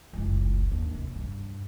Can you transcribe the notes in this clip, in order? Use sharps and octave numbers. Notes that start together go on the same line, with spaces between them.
F#1 C#2
D#2 D4
C3
G2